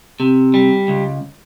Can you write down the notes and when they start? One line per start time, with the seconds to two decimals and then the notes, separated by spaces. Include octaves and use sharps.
0.20 C3
0.54 G3
0.88 C#2